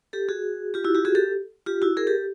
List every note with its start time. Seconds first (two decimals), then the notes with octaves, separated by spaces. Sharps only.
0.13 G4 A4
0.29 F#4 G#4
0.74 F4 G4
0.84 E4 F#4
0.95 F4 G4
1.05 F#4 G#4
1.15 G4 A4
1.66 F4 G4
1.82 E4 F#4
1.97 G#4 A#4
2.07 G4 A4